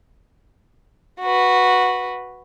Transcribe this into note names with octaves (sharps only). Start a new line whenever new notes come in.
F#4 B4